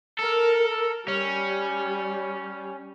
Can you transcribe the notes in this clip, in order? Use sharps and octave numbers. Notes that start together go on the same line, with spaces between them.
A4 A#4
G3 C#4